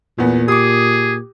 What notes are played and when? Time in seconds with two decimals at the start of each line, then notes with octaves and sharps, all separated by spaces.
0.18 E2 A#2 B3
0.48 G4 G#4 D6 D#6